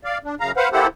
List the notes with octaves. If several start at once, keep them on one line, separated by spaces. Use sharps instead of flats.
D5 F5
D4
F#2 C#3 F5 A#5
B4 C5 F5 F#5
A#3 E4 G4 A4 C5 F#5